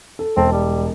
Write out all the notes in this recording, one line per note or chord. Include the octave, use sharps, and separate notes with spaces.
A4
E1 C4 A5
G3